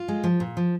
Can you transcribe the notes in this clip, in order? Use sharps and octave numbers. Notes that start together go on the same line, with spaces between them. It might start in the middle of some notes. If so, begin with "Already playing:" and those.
Already playing: F4
G#3
F3
A#2
F3